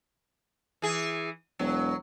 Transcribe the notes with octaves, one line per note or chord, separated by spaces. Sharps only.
E3 G#4
E1 F#3